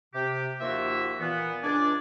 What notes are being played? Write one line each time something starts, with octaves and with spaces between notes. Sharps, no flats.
C3 G4
D#2 F3 A#3 F4 F#4 E5
A#2 E3 B3
C#2 D4 D5 G#5